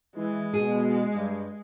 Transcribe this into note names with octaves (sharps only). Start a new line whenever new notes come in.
E3 G#3
B2 G#4
G2